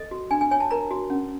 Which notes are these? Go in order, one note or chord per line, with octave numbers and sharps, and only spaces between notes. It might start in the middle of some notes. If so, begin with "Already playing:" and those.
Already playing: A4 D#5
F#4
D4 G#5
G#5
C#5 G#5
A5
A#4 A#5
F#4
C#4